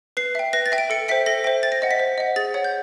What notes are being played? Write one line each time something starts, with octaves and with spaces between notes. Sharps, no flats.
B4 C7
E5 G5
B4 A#6
A6
E5 G5
D7
A4 C#7
C5 E5 G5 B6
A4 A#6
C5 E5 G5
C5 A6
A#6
D#5 F#5
B6
C5
D#5 F#5
G#4 A6
C#5 F#5
G6